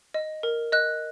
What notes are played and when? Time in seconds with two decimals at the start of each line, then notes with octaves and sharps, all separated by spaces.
0.14 D#5
0.43 A#4
0.72 D#5 F#6